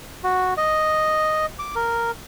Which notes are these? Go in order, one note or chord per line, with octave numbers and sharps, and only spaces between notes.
F#4
D#5
D6
A#4